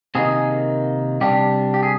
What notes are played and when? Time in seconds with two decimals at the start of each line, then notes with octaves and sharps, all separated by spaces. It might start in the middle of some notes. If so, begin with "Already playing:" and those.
0.15 C3 D#3 A#3 D#4 G#4
1.21 C3 G3 D4 G4
1.74 G4
1.83 G#4